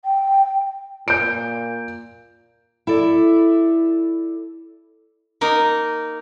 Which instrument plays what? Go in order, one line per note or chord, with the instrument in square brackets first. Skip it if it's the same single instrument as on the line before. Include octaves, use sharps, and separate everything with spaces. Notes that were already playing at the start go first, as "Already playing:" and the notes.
[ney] G5
[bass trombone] A#2 [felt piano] G6 D7
[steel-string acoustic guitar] E4 A4 D5
[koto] A#3 D#4 A#4